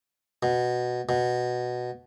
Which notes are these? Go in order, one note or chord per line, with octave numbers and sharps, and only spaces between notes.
B2
B2